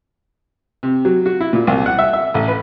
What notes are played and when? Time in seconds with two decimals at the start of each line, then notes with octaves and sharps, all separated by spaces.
0.83 C3
1.05 F#3
1.26 F#4
1.41 E4
1.53 A#2
1.67 C2
1.86 F#5
1.99 E5
2.13 E5
2.34 A1
2.48 B4